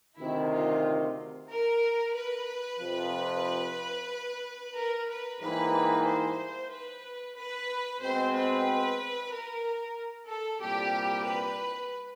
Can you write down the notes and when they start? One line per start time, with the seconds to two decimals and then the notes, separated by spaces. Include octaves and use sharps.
0.19 D2 C3 D#3 E4
0.52 F4
1.50 A#4
2.15 B4
2.80 F2 C3 F3
4.75 A#4
5.08 B4
5.40 G#2 E3 G3 A#3 D#4 B4
6.05 C5
6.70 B4
7.35 B4
8.01 B2 G#3 C4 C5
8.33 B4
9.31 A#4
10.29 A4
10.61 C2 A#2 G3 G4
11.26 B4